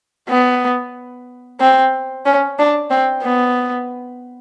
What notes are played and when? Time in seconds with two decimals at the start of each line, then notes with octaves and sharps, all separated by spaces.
0.29 B3
1.61 C4
2.26 C#4
2.59 D4
2.90 C4
3.23 B3